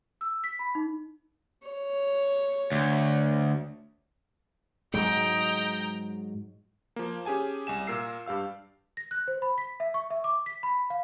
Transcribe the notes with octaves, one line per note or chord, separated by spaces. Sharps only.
E6
B6
B5
D#4
C#5
D2
G#2 F#3 G#3 D#5 G5 A#5
F3 A#3
C#4 G4 G#4 G#5 A5
C2 G#5 E7
A#2 A#4 E6 C7 E7
G2 G4 F5 E6
A#6
F#6
C5
B5
B6
E5
C#6
E5
D6
B6
B5
F5